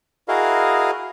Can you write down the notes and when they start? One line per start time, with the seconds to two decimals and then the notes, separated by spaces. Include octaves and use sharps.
0.28 E4 F#4 G#4 A#4 D#5 F5